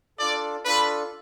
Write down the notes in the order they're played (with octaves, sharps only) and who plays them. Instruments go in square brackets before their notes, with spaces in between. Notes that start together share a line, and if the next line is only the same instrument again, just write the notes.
[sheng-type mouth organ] D4 F4 A4 [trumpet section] D5
[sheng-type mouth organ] D4 F4 A4 [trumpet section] B4